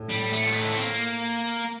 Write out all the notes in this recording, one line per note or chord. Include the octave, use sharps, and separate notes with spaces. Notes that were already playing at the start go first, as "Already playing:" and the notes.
Already playing: A2
G3
A3
F4
D#4
D4
C4
A#3